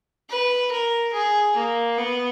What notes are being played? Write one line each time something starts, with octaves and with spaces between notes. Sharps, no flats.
B4
A#4
G#4
A#3
B3